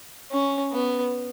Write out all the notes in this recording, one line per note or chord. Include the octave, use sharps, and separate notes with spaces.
C#4
B3